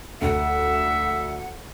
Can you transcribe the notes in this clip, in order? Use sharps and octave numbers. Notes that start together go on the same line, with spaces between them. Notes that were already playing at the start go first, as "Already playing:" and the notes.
D2 E5 F#5